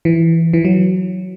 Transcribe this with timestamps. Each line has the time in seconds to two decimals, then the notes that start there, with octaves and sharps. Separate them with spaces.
0.05 E3
0.53 E3
0.65 F#3